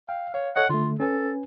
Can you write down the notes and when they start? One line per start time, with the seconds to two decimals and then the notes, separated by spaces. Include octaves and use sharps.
0.09 F5 G5
0.34 C#5 F5
0.56 A4 C#5 D#5 F#5
0.69 D3 A3 F4
1.00 C#4 A4 B4 G#5